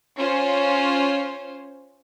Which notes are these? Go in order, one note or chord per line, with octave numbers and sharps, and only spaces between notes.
C#4 F4 C5